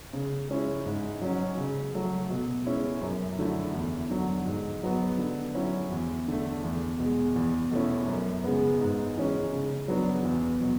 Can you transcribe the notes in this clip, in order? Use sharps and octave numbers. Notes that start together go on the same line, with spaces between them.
C#3
G#3 C#4 E4
G#2
F#3 C#4
C#3
F#3 A3
B2
G#3 C#4 E4
F#2
D3 F#3 A3 E4
E2
D3 F#3
G#2
F#3 B3
D3
F#3 C#4 E4
E2
D3 A3
E2
B2
G#3
E2
B2 A3 C#4 E4
F#2
C#3 G#3 B3
G#2
E3 G#3 C#4
C#3
F#3 B3 D4
E2
B2 F#3